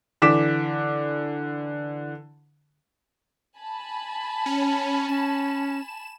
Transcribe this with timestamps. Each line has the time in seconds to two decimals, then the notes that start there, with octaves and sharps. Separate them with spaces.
0.22 D3 E3 D6 B6 E7
3.58 G#5 A5 B5
4.46 C#4
5.08 C#4 E7